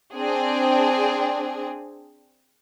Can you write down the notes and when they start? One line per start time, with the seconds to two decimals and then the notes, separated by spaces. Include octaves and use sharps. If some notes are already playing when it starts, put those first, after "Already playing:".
0.14 C4 D4 G#4